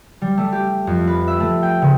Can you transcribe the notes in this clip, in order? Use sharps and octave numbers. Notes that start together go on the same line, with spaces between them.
G3
A3
G4
F2
B4
E5
A3
G5
C#3